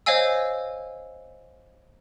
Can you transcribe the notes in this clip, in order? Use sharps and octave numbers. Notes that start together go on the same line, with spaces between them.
C5 C#5 D#5 F5 G#5 E6